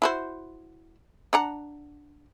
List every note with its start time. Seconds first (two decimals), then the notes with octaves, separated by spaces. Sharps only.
0.02 E4 F#4 C5
1.33 D4 F#5 A#5